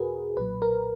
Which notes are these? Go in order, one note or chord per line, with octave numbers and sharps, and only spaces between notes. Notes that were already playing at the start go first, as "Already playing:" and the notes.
Already playing: E2 B2 F#4 G#4 A#4 B4
B1 A#2 F#3 B4
A#4